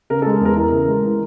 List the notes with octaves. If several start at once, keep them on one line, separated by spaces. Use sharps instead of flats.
C#3 A#4
A4
G#3
A4
E2 A#4
E3 A#4
C#3
G#3
E3